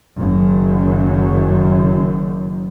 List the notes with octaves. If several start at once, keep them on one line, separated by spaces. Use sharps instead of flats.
F#1 F#2 D#3